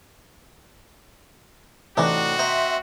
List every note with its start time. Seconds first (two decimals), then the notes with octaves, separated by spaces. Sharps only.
1.97 A2 C3 E3 C4 D4 D#4 F#4
2.39 C5 D#5 E5 A#5 C6